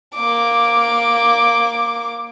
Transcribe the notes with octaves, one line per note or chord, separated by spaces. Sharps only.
A#3 D6